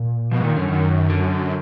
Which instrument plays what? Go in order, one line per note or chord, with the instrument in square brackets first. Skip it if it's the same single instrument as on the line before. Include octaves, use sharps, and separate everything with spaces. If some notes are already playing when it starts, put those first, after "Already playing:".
Already playing: [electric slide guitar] A#2
[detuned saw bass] B2 [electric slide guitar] F3
[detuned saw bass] G#2
[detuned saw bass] A#2 [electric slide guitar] D#3
[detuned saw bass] F#2 [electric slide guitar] D3
[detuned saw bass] F#2 [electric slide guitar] D#3
[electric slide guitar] D3